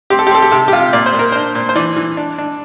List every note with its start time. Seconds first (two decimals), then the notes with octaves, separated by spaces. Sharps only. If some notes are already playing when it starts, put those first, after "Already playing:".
0.10 C4 G4
0.19 A4
0.27 G4
0.31 C4 A4
0.42 G4
0.51 C3 A4
0.68 G4
0.73 C3 F4
0.93 A#2 D5
1.06 C5
1.14 A#2
1.19 A#4
1.32 D4 C5
1.55 A#2
1.69 C5
1.75 E3 D5
1.96 E3
2.17 D4
2.38 D4